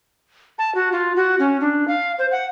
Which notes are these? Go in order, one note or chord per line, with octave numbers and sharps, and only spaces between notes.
A5
F#4
F4
F#4
C#4
D4
F5
C5
F#5